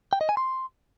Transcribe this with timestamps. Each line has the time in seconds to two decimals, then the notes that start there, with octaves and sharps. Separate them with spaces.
0.13 G5
0.21 D#5
0.29 G#5
0.37 C6